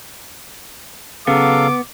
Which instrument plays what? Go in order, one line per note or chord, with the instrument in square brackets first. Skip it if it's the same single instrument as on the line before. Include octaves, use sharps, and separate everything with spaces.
[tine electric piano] C#3 [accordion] F#3 A4 F5 [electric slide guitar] B3 [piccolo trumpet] D6